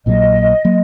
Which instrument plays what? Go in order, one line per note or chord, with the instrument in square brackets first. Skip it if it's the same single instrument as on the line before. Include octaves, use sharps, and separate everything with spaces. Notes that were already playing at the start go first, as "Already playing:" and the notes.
[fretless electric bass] A#1 A#2 F#3 A#3 [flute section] D#5
[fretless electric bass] F#3 A#3